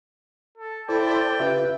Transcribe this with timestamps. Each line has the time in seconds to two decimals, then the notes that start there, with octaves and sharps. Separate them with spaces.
0.58 A4
0.89 E4 A4 C5 D5 G5 A5
1.40 C#3 F4 G4 B4 E5